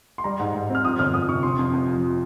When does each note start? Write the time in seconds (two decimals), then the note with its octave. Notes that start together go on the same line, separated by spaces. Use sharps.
0.18 C6
0.24 G3 A#5
0.39 G#2
0.55 G#2
0.70 C4 F6
0.84 F2 D#6
0.98 G1 F6
1.14 F3 D#6
1.29 C3 C#6
1.43 C3 C6
1.59 F2
1.73 F2
1.88 F3